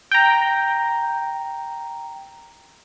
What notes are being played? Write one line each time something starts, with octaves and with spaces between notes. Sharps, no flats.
G5 A#5